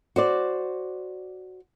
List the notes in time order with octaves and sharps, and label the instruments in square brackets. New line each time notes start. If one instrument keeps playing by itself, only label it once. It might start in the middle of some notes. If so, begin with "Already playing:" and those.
[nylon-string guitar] F#4 C5 D5